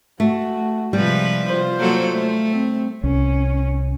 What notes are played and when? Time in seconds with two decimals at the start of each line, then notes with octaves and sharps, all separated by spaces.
0.20 A3 F#4
0.93 C3 F3 G3 G#3 B4
1.47 F4 C5
1.80 F#3 A#3 A4
2.12 A3
2.51 C4
3.03 C2 C#4